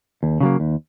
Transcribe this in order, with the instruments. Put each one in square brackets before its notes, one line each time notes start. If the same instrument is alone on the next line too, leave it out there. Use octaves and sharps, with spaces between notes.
[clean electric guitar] D#2
C#3 F#3 A#3
D#2